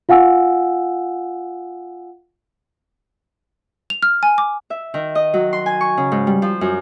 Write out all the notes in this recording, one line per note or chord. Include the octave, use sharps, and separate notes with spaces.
F4 F5 F#5 G#5 E6
F7
F6
G#5
D6
E5
D#3
D#5
F#3
C6
G#5
C#6
C#3
G#2
G3
F3
F#2